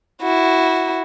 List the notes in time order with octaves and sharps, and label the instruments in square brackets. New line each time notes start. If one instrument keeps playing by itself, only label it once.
[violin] E4 F#4